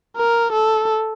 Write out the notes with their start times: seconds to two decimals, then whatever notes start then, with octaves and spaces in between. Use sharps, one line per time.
0.17 A#4
0.53 A4